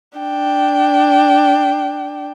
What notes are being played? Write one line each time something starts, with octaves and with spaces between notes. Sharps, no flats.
D4 G5